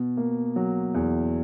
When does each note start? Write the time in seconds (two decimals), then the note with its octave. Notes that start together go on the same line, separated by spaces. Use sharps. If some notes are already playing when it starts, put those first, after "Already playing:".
Already playing: B2
0.17 A#3
0.56 F#3
0.94 E2